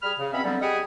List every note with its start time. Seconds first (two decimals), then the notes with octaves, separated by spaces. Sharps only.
0.03 G3 G#4 B5 F6
0.19 C#3
0.33 B2 C4 C#4 E5 B5
0.44 D3 F#3 G3 B3 C4
0.61 G4 G#4 D#5 F#5 G#5 B5